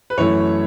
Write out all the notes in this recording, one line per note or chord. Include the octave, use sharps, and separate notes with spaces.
B4
F#2 E3 A3 E4 C#5